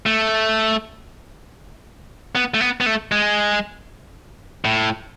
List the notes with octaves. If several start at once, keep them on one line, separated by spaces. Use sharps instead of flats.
A3
B3
A3
B3
B3
A3
G#3
A2